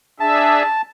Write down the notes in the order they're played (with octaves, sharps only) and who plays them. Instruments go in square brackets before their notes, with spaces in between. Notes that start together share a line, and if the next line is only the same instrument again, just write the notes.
[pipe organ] D4 G#4 E5 [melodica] A5